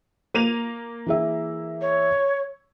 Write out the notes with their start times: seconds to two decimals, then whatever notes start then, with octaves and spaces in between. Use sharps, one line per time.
0.34 A#3 D#7 F7
1.06 E3 G#4 E5
1.81 C#5